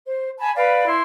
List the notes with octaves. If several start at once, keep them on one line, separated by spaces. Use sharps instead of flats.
C5
G#5 A5 B5
B4 D5 F5 B5
E4 C6